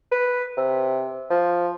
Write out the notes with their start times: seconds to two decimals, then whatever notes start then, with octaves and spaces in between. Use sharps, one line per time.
0.12 B4
0.57 C3
1.30 F3